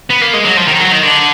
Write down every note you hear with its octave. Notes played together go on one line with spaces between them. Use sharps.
B3
A#3
G#3
F#3
F3
D#3
F#3
D#3
D3